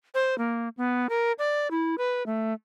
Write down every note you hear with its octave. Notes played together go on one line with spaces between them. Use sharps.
C5
A#3
B3
A#4
D5
E4
B4
A3